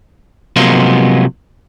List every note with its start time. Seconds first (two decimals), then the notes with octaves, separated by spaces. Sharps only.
0.56 C3 F3 F#3 G#3 A#3 B3